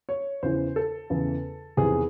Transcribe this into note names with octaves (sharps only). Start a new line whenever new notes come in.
C#5
E2 C#3 E3 C5
A4
E2 C#3 E3
E2 C3 D#3 G#4